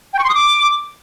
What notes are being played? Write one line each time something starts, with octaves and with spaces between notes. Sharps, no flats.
G5
C#6
C6
D#6
D6